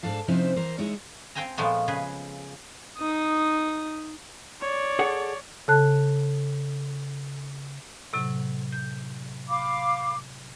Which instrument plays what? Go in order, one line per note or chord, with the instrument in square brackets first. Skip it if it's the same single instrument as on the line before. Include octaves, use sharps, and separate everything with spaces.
[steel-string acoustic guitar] G#2 D4 A4 F5 A5
C3 F3 C#4 D#4 E4 C5
E3 A#4 C5
G#3 D#4 E4 C#5
[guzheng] C4 C5 G5 G#5 A#5
A#2 F3 G#3 A3 B3
C#3 G#4 B4
[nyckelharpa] D#4 D#6
[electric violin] C#5 D5
[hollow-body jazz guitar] G#4 A4 F#5
[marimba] C#3 A4 A5 F#6
A2 C3 F#3
G6
[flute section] F5 B5 D6